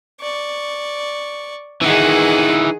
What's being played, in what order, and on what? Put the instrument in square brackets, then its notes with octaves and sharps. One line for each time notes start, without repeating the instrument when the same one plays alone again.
[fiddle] D5 C#6
[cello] D#3 G#4 [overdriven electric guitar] E3 D#4 [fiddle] F#5